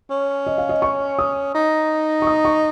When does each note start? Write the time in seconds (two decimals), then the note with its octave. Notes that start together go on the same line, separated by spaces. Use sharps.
0.10 C#4
0.46 D#5
0.58 F5
0.69 D#5
0.82 C#6
1.19 D#6
1.55 D#4
2.22 C#6
2.27 D#6
2.45 C#6